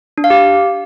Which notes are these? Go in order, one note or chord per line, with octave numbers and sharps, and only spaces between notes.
D4
F5
G4